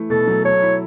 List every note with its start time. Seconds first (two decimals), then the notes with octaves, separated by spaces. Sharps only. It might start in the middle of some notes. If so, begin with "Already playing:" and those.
Already playing: E3 A3 E4
0.10 B2 A4
0.27 F#3
0.45 A4 C#5
0.62 E4